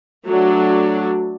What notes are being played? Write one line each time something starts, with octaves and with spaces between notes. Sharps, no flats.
F#3 A3 D4